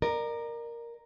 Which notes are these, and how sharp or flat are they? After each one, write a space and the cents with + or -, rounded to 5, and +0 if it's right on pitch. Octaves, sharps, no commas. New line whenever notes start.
A#4 +0 D5 +40